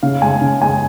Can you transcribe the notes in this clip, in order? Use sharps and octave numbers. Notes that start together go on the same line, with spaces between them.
C#3 F5
G#3 G#5
C#3
G#3 G#5